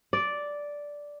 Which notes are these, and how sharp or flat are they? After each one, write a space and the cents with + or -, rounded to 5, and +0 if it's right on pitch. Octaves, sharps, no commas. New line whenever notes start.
D5 -5